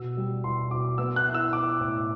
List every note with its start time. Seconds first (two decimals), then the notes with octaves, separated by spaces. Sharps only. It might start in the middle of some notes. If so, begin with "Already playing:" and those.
Already playing: B2 E6
0.17 G3
0.44 B2 C6
0.71 B2 D6
0.98 B3 E6
1.16 F#6
1.25 E4
1.34 E6
1.53 E4 D6
1.80 A2